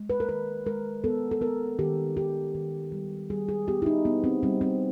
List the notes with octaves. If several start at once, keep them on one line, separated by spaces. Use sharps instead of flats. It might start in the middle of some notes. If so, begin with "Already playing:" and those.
Already playing: G#3
B4
A#4
D#3 B4
G#3 A#4
B3 A4
A4
B3 A#4
D#3 G4
D#3 G4
D#3
G3
G3 G#4
G#4
B3 G4
E4
D#4
B3
C4
G3 C4
C4